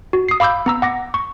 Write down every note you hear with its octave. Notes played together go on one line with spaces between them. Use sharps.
F#4
D#6 C7
F5 B5 D6 E6 G6
B3 A#5 E6
F#5 D6 A#6
C#6